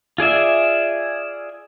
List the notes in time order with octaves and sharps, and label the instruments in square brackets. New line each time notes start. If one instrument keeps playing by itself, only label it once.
[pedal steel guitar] F4 G#4 D5 E5